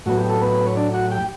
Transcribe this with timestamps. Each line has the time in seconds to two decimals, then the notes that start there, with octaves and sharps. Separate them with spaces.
0.06 A2 F#3 B3 F#4
0.18 G4
0.29 A4
0.41 B3 B4
0.66 C#5
0.76 D4 D5
0.94 F#4 F#5
1.11 G4 G5